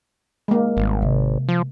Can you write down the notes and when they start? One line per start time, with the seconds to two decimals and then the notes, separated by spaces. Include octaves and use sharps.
0.48 G#3 A#3
0.77 G#1 G3
1.02 C3
1.48 F3